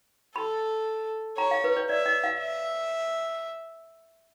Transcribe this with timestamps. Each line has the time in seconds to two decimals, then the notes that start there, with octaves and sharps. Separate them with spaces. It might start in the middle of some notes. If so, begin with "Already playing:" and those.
0.36 A4 B5
1.38 C#5 A#5
1.51 F5
1.64 B4
1.77 C#5
1.89 D5 E5
2.06 D#5
2.24 F5
2.40 E5